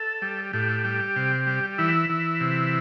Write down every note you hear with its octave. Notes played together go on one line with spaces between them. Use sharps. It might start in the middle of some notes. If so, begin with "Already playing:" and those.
Already playing: A4
G3
A2 G4
G3
C3
G3
E3 E4
E3
C3